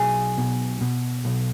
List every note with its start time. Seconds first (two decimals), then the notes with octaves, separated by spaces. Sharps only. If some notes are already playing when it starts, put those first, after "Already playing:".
Already playing: B1 G#4
0.38 B2
0.81 B2
1.25 B1